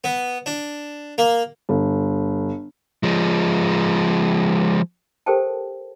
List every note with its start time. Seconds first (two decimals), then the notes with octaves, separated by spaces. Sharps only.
0.04 B3
0.46 D4
1.18 A#3
1.69 G1
3.03 F3 G#3
5.26 G4 A4 A#4 C5 G5 A5